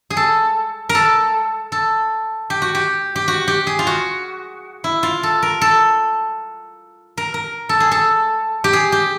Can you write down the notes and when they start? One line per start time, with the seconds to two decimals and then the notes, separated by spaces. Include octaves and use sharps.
0.10 G#4
0.17 A4
0.89 A#4
0.95 A4
1.72 A4
2.50 G4
2.62 F#4
2.75 G4
3.16 G4
3.28 F#4
3.48 G4
3.67 G#4
3.79 F4
3.87 F#4
4.84 E4
5.03 F4
5.23 A4
5.42 A#4
5.61 A4
7.17 A#4
7.34 A#4
7.69 A4
7.80 G#4
7.91 A4
8.64 G4
8.73 G#4
8.92 G4